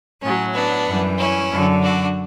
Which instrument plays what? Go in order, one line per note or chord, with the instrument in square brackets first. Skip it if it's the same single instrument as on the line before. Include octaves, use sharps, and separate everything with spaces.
[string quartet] A2 F#3 C#4
B3 D4
F#2 E3 G3
C#4 E4
F#2 D3 F#3
D4 F#4